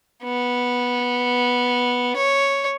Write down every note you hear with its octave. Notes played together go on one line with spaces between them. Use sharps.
B3
C#5